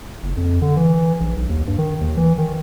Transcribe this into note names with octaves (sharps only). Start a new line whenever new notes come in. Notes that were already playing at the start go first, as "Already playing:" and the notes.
F#1
F2
D3
E3
A#1
B1
D#2
G2
D#3
D#2
E3
D#3